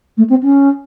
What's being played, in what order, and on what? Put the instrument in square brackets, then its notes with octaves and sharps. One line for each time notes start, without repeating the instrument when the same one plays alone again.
[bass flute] A3
C4
C#4